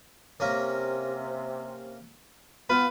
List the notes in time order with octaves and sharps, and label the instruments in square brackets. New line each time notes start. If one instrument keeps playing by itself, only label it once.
[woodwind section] C3 [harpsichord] A#3 C#4 A#5
[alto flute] B3 [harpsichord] F4 [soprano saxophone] B4